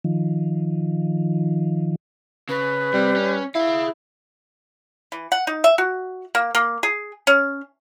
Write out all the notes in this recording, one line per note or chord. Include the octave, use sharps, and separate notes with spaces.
D#3 F3
C#3 B4
C3 G3 C4
C#4
E4 G#4 F5
E3
F#5
D#4
E5
F#4
A#3
A#3
G#4
C#4